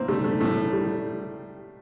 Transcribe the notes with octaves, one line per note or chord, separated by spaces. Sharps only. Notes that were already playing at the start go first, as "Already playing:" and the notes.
Already playing: A2 A#3 C4
G3 A3
A3
A2 A3
G3